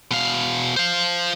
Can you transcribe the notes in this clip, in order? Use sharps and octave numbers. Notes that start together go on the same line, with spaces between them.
B2 F5
C5 F5